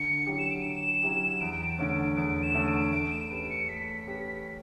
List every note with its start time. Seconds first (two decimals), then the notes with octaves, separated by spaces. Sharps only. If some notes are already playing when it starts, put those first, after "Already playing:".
Already playing: D3 C#7
0.26 F#3 C#4 E4 G4
0.38 E7
0.50 D7
0.62 D3 E7
1.03 F#3 C#4 E4 G4
1.40 E2 D7
1.78 D3 A3 C#4 D7
2.16 E2 D7
2.43 E7
2.54 D3 A3 C#4
2.68 D7
2.93 A3 D7
3.11 E7
3.30 C#4 G4 B4 D7
3.50 C#7
3.69 A3 B6
4.07 C#4 G4 B4